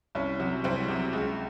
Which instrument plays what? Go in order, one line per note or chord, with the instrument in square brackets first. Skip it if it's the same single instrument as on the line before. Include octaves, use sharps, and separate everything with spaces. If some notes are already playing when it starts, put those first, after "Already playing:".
[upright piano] C2 C#4
C3 F#3
C2 C4
C3 F#3
C#2